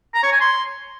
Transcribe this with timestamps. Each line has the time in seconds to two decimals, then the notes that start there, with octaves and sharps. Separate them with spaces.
0.14 A#5
0.23 C#5
0.32 G#5
0.41 C6